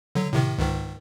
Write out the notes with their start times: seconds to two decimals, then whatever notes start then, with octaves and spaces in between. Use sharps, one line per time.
0.15 D3 F#3
0.33 A2 C3 D#3
0.58 C#2 G#2 D#3